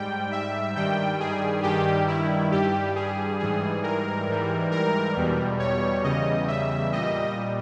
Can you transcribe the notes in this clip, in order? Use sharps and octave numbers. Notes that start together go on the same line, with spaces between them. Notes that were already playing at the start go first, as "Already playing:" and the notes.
Already playing: G#2 G3 G5
E5
G2 D#3 G3 G5
G#4
G2 D#3 G3 G4
E4
G2 G3 G4
G#4
G#2 E3 G3 G#4
A#4
G#2 E3 G3
A#4
E2 B2 G3
C#5
E2 C#3 G3 D#5
E5
A#2 G3 D#5